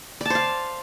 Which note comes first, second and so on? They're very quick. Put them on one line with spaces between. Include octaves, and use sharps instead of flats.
D5 A5 C5 F5